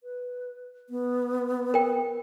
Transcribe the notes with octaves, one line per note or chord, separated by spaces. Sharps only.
B4
B3
A#4 G5